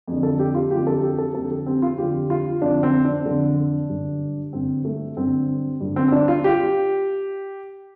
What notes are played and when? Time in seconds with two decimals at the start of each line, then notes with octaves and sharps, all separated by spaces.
0.07 F2 D3
0.23 A4
0.39 G4
0.55 F4
0.71 F2 D3 G4
0.87 A4
1.03 G4
1.18 A4
1.35 F2 D3 A4
1.50 G4
1.66 C4
1.82 F4
1.98 F2 D3 G4
2.30 F4
2.62 F2 D3 D4
2.83 C4
3.05 D4
3.26 F2 D3
3.89 G2 D3
4.53 G2 D3 C4
4.85 A3
5.17 G2 D3 C4
5.80 G2 D3
5.96 C4
6.08 C4
6.12 D4
6.28 F4
6.44 G4